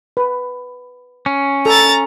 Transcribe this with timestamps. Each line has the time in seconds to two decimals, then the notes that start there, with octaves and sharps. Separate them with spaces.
0.17 B4
1.26 C#4
1.66 A4 A#5 A6